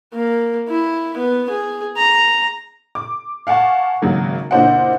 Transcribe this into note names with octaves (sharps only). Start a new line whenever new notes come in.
A#3
E4
B3
G#4
A#5
D6
F5 F#5 G#5 A5 C#6
G#1 C#3 F#3 A#3
F#1 A#2 D4 C5 D#5 F#5